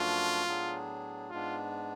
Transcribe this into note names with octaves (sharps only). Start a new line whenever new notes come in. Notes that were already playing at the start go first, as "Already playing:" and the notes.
Already playing: F#2 F3 A3 D4 F4 F#4
A2 F#3 B3 D4 G#4
G#2 G#3 B3 D4 F4